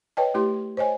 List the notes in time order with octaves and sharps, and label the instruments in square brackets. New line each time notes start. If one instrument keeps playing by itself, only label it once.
[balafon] B4 C#5 D#5 G5 A5
A3 E4 G4 C6
C5 C#5 D#5 G#5